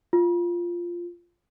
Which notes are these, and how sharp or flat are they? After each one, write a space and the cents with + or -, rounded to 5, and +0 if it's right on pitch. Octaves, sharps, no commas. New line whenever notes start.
F4 -5